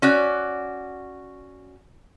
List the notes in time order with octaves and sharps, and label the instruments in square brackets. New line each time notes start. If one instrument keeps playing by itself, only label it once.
[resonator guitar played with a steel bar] C#4 F#4 D5